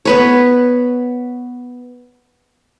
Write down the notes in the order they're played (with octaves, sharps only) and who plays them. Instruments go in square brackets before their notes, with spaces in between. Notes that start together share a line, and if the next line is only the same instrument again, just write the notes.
[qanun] B3 B4 C#5